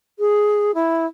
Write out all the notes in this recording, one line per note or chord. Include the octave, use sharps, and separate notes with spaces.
G#4
E4